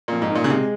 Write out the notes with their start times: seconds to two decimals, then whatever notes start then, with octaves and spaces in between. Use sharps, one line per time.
0.08 F2 A#2
0.22 G#2
0.30 A#2 D#3
0.44 C#3
0.50 C3 G#3